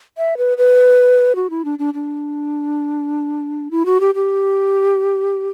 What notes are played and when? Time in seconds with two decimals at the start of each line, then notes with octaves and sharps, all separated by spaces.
0.18 E5
0.37 B4
0.58 B4
1.36 F#4
1.50 E4
1.65 D4
1.79 D4
1.94 D4
3.71 E4
3.86 F#4
4.00 G4
4.15 G4